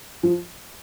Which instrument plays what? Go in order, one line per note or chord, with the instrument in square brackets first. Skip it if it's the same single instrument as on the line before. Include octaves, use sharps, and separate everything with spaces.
[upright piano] F3